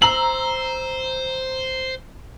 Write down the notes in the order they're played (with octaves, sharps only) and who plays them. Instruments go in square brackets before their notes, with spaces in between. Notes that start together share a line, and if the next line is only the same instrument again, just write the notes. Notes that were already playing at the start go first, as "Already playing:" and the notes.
[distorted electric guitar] C5 [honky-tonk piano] A#5 E6 [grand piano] F#7